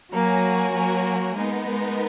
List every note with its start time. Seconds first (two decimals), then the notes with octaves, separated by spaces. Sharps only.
0.13 F#3 A#3 F#4 A#4 C#5 G#5
0.74 F#3 A#3
1.36 G#3 B3 D#4 A#4
1.68 G#3